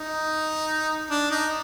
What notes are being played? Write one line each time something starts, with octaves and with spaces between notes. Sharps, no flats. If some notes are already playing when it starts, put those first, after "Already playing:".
Already playing: D#4
D4
D#4